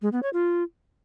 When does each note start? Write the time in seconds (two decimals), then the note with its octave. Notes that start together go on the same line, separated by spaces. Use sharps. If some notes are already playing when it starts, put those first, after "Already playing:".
0.02 G#3
0.12 B3
0.23 C#5
0.33 F4